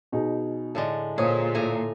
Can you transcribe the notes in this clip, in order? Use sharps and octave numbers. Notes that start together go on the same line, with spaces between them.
B2 D#4 G#4
A2 D3 G#3
A#2 G#4 C5 C#5 D#6
A2 G#5 A#5